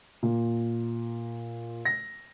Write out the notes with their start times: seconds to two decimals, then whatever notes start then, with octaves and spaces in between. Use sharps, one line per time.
0.23 A#2
1.85 A#6